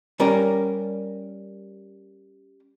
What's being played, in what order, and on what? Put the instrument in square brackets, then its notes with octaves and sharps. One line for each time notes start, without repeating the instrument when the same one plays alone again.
[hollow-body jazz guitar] G3 C#4 A#4 D5